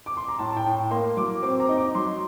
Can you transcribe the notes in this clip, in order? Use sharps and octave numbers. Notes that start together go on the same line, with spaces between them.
D6
C6
A#5
A2 A5
A5
G5
A2
A#3 C6
F#3 D6
C4 D6
A#5
D#4
D6
F#3 C6